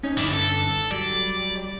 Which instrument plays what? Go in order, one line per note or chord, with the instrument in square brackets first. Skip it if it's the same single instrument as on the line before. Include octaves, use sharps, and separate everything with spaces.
[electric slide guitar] C#4 D#4 C#5
[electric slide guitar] G2 D3 [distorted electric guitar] E4 D5
[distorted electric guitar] A4
[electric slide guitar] F#3 G3 [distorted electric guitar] D5